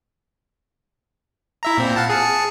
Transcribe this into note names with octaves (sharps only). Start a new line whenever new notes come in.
E4 E5 A#5
A#2 C4
F5 F#5 A5
G#4 A5 C#7